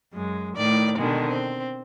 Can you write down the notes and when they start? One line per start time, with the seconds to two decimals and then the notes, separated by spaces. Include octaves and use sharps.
0.12 F#2 G#3
0.55 A2 D#3 D5 D6
0.98 B2 D3 D#3 G#3
1.30 C4